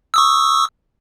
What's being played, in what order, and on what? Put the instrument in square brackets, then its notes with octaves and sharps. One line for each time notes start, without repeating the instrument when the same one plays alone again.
[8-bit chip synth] C#6 D#6 E6